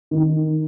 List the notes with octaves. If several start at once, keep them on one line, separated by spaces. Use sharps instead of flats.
D#3